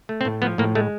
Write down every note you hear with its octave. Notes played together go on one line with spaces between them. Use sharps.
A3
C4
A2
F3 B3
A2 A#3
G#3 A3